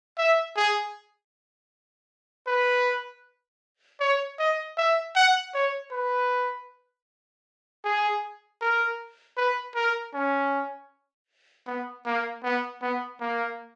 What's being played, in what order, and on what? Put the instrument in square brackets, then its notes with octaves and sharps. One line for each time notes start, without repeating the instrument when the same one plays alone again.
[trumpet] E5
G#4
B4
C#5
D#5
E5
F#5
C#5
B4
G#4
A#4
B4
A#4
C#4
B3
A#3
B3
B3
A#3